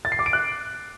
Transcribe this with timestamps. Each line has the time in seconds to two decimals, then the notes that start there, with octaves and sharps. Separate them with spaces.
0.05 A6
0.12 C7
0.19 D6
0.26 D7
0.33 F#6